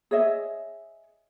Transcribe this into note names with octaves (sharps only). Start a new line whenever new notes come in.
G#4 C#5 D#5 E5